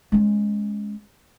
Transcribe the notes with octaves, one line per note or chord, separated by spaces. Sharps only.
G#3 C#4